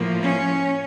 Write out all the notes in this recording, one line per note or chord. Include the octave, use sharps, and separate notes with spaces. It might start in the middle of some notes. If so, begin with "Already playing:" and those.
Already playing: A2 F3 A#3
C#4